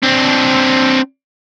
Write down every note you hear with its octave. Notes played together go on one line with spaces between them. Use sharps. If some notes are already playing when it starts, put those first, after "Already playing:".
C4 D4